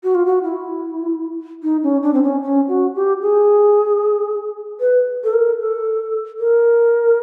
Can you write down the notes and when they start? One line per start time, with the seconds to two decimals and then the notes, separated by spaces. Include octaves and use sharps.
0.04 F#4
0.15 F4
0.26 F#4
0.43 E4
1.63 D#4
1.83 C#4
2.03 D4
2.13 C4
2.23 C#4
2.42 C#4
2.68 F#4
2.95 G4
3.22 G#4
4.80 B4
5.24 A4
5.33 A#4
5.59 A4
6.39 A#4